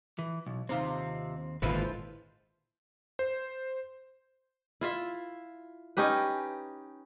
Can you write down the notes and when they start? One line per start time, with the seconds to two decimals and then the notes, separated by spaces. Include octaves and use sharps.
0.19 E3
0.46 B1
0.69 D#2 C3 C4 D#4 F4
1.62 G#1 A#2 D3 F3 G#3 E4 F4 B4
3.19 C5
4.81 E4 F4 E5
5.97 C#4 D#4 G4 B4